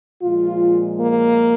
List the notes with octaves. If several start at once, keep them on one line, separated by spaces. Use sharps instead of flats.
A#2 F3 G#3 F4
A#3